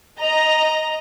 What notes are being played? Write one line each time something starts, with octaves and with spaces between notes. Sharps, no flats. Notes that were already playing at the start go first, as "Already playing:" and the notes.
D#5 A#5